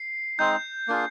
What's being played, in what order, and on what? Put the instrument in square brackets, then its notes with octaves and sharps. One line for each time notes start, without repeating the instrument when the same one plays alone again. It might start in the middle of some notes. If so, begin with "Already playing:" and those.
Already playing: [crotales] C7
[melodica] G#3 C4 D#4 [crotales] G6
[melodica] A#3 D4 F4 G#4